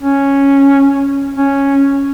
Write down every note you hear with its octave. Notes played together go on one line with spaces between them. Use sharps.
C#4
C#4